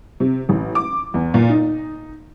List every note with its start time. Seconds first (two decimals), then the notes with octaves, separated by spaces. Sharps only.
0.20 C3
0.49 A1
0.75 D6
1.14 E2
1.34 A#2
1.49 D#4